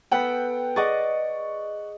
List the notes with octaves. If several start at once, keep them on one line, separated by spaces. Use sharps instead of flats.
B3 A4 B4 F#5 G5
G#4 D5 D#5 F#5 C#6 A6